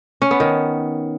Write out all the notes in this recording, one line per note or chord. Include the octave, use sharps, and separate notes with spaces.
C#4
B3
D#3